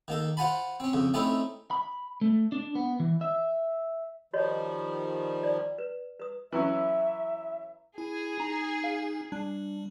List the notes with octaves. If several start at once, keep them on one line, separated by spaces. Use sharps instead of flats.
D#3 A#3 A4
F4 C5 F#5 G#5 A5 B5
C4 C#4
F2 C#3
A3 C4 C#4 D#4 E4 A4
B5
A3
D4
B3
E3
E5
D#3 F3 G3 F#4 C#5 D#5
D5
B4
B4 D#6
E3 F#3 C#4 E5
E4 G#4
D#4 A#5
F5
G3 D4